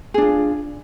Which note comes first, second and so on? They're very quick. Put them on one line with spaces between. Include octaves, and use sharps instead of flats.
G#4 D4 F4